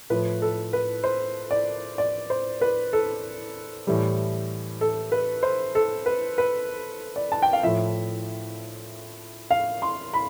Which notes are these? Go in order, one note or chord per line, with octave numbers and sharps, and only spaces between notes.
A2 F3 B4
A4
B4
C5
D5
D5
C5
B4
A4
A2 E3 G3
A4
B4
C5
A4
B4
B4
D5
A5
G5
F5
A2 F3 E5
F5
C6
B5